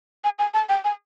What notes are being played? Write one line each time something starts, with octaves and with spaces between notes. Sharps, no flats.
G#5
G#5
A5
G5
G#5